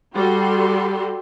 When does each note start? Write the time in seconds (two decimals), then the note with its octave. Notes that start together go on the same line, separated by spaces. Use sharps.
0.14 G3 F#4 G4 A4 C6